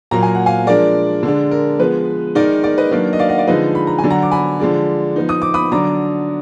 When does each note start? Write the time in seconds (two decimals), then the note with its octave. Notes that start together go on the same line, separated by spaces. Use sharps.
0.11 A#2 F#3 A#3 A#5
0.23 G#5
0.35 F#5
0.46 F5 G#5
0.67 F3 G#3 D4 A#4 D5
1.23 D3 G#3 D4
1.51 A#4
1.79 F3 G#3 B3 B4
2.35 D#3 G#3 D#4 A#4 D5
2.64 A#4 D5
2.78 B4 D#5
2.91 D#3 F#3 A#3 D4 B4
3.13 D#5
3.19 D5 F5
3.29 D#5 F#5
3.38 D5 F5
3.47 D3 F3 G#3 D#4 B4 D#5
3.75 B5
3.87 A#5
3.98 G#5
4.04 D3 F#3 D4
4.10 F#5 A#5
4.22 D6
4.31 G#5 B5
4.59 D3 F3 G#3 D4
5.16 F3 B3 D#4
5.29 D#6
5.42 D6
5.54 B5 D#6
5.72 D3 F#3 D4 A#5 D6